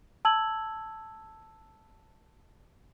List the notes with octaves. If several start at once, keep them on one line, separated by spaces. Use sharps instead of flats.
A5 E6 G#6 F#7